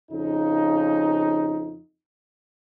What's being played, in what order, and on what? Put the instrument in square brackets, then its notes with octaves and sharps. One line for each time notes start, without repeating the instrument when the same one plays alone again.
[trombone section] F2 C#3 D#4